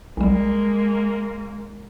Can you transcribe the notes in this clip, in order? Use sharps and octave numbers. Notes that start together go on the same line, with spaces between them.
B1 G3 G#3 A#3